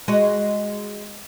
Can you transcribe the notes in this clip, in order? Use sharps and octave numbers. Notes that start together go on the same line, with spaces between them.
G#3 F#4 D#5